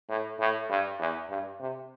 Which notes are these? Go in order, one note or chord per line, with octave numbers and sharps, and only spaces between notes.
A2
A2
G2
E2
G2
C3